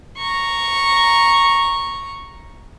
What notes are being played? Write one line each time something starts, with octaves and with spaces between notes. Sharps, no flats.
A#5 C#6